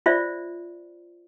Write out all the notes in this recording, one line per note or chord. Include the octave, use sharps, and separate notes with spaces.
F4 C5 D5 E5